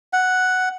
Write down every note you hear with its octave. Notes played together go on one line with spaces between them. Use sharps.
F#5